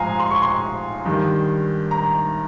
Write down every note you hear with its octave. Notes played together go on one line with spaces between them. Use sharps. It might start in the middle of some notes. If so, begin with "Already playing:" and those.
Already playing: G#2 F3 F5 G#5 A#5
C6
C#6
C6
G2 D#3
A#5